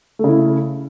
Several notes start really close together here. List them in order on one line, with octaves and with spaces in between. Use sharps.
A3 C#3 E4